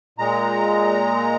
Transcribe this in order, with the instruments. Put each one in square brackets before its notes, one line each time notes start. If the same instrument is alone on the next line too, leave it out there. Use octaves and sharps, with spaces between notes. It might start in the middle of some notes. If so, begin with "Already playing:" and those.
[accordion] A#2 G#3 A#5